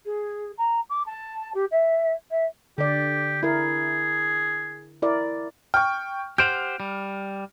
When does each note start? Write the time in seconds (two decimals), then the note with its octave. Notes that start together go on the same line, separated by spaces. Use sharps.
0.06 G#4
0.58 A#5
0.89 D6
1.06 A5
1.54 G4
1.71 E5
2.30 E5
2.78 D3 G4 D5
3.43 E4 G#4 A#4
5.02 E4 A#4 D5
5.74 G5 C#6 F6
6.38 G4 C5 F#5 F6 G6 D7 F7
6.80 G3